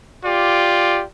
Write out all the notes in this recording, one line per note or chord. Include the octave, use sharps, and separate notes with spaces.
F4 G4 D5